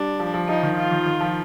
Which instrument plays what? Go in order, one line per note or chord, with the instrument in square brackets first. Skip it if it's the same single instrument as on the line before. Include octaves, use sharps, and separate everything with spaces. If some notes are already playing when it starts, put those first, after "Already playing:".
Already playing: [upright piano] G3 [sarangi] D4
[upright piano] F3
F3
[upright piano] F3 [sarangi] D#4
[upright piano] D#3
[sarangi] F4
[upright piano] D#3
D#3
F3